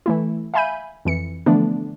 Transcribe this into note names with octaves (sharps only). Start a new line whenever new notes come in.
E3 A3 E4
E5 F5 G#5 B5 G6 D#7
F2 E3 C#7
D3 E3 F3 A3 B3 D4